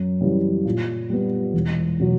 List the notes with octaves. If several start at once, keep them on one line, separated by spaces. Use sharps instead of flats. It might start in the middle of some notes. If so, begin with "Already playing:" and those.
Already playing: F#2
C#3 E3 G3
A#2
G3 B3
E1
B2 F#3